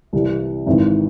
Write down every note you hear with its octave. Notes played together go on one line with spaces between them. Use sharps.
C2 C3 E3
G#1 G#2 E3